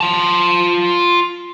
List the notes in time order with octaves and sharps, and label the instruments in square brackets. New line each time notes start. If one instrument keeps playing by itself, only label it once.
[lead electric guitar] F4 A5